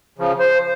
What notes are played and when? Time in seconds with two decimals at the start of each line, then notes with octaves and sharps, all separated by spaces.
0.18 C#3 F3
0.39 C5